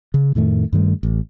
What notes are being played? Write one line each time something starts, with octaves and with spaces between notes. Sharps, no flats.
C#3
F2 A2 D#3 A3
G2 D#3 G3 A3
A1